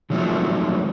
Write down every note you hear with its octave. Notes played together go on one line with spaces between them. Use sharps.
D#3 F3 F#3 G#3 A3 C4